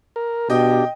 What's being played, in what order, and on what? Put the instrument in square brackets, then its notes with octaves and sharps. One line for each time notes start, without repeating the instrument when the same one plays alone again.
[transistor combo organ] A#4
[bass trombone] B2 [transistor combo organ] D4 G4 [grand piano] D#5 G5